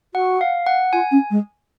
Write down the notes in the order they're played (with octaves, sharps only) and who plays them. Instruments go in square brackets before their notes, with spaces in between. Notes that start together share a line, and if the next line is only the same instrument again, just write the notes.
[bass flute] F#4 [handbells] F#5
[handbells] F5
F#5
[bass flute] F4 [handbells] G#5
[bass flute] C#4
G#3